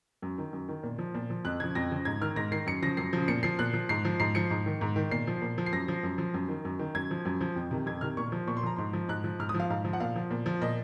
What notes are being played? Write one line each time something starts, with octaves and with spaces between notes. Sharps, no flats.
F#2
D#3
F#2
D#3
A#2
F3
A#2
F3
F2 F#6
C#3 F3 G#6
F2 A#6
C#3 F3
G#2 G#6
D#3 F6
G#2 A#6
D#3 C7
F#2 C#7
C#3 F3 A#6
F#2 C7
C#3 F3
A#2 C#7
F3 C7
A#2 F#6
F3
G#2 C7
F3
G#2 C7
F3 C#7
G#2
D#3
G#2
D#3
A#2 C7
F3
A#2
F3
C7
F#2 A#6
F3
F#2
F3
F#2
D#3
F#2
D#3
F#2 G#6
F3
F#2
F3
F2
C3 D#3
F2 G#6
C3 D#3 F6
A#2 C#6
F3
A#2 C#6
C6
F3 A#5
G#2 C6
F3
G#2 F#6
F3
G#2 F6
D#6
F3
F5
G#2 F5
F3
F#5
A#2 F5
F3
A#2
F3
A#2 D#5